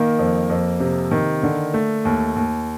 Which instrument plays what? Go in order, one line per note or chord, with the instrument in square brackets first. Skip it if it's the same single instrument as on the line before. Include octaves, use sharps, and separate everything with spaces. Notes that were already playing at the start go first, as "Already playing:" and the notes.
Already playing: [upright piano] D#3 [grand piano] A#3
[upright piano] F2
F2
C3
D#3
D3
A3
D#2
D#2